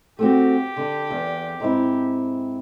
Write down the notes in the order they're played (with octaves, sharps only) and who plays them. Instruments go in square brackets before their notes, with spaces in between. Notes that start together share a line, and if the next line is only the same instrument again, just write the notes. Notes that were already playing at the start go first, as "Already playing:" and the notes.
[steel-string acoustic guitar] A3 C4 F#4 [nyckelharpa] G4
[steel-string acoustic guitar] D3
E2
G#2 C4 E4